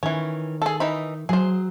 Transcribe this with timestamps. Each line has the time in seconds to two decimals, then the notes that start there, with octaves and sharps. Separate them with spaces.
0.03 D#3 E3 C#4
0.62 G#4 A4
0.80 E3 D#4 B5
1.29 F#3 G#4 C5